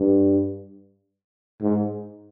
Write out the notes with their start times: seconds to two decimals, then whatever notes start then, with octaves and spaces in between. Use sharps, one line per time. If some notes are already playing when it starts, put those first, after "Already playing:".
Already playing: G2
1.62 G#2